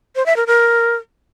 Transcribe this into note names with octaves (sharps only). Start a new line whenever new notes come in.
C5
E5
A#4
A#4